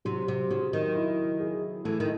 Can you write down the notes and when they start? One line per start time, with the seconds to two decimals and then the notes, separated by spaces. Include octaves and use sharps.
0.05 C3 F#3
0.28 C3
0.51 C#3 F#3
0.73 D#3
0.95 E4
1.40 G#4
1.85 E3 A3
2.00 D#3